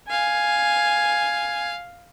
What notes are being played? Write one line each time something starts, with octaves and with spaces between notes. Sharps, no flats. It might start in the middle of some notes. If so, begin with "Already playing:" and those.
F5 G#5